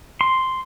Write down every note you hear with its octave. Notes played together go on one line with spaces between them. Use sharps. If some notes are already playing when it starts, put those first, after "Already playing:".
C6